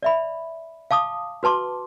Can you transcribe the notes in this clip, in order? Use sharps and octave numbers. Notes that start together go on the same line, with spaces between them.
D5 E5 B5
F5 A5 D6 D#6
F#4 B4 A5 C6 D6